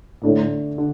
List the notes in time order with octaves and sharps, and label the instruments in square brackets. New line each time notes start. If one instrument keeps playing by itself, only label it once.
[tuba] A2 [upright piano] D3 A3 D4
[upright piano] D3